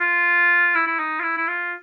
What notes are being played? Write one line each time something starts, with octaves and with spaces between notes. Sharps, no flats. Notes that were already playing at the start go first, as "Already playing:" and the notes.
F4
E4
E4
D#4
F4
E4
E4
F4